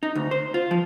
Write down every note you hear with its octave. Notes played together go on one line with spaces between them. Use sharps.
D#4
D2
C5
F4
F3